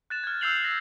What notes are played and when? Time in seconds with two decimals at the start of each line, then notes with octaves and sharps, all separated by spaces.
0.10 F#6 A6 E7
0.24 F6 G#6
0.41 E6 F#6 G6 C7 F7 F#7
0.64 A#6